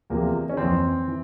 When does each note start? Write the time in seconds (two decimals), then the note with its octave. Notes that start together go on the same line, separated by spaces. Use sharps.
0.10 E2 C3 F3 A#3
0.50 C#4
0.57 F2 E3 C4
1.07 E3